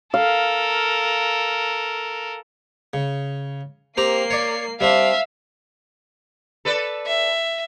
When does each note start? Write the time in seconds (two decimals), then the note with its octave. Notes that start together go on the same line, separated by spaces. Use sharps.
0.14 A4 A#4 F5
2.94 C#3
3.97 A#3 C4 G4 A#5 C7
4.30 C#5 D5
4.81 G3 C4 D4 E5 F5
6.65 A4 B4 D5
7.07 E5